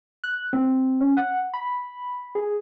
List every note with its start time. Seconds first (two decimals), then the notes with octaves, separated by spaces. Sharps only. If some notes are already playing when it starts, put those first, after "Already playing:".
0.24 F#6
0.53 C4
1.01 C#4
1.17 F#5
1.54 B5
2.35 G#4